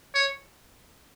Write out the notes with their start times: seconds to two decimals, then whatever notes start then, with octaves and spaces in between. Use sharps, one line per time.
0.15 C#5